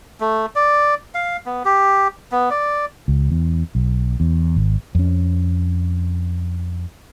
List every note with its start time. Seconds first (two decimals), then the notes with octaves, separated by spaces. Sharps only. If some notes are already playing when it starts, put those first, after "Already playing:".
0.20 A3
0.55 D5
1.14 F5
1.46 B3
1.65 G4
2.32 B3
2.50 D5
3.08 C#2
3.31 E2
3.75 B1
4.20 E2
4.56 G#1
4.95 F2 C#4